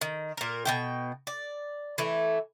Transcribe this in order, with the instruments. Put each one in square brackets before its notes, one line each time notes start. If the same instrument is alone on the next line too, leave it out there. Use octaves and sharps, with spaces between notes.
[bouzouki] D#3
A#2 A#4
B2 G3 G5
D5
E3 A3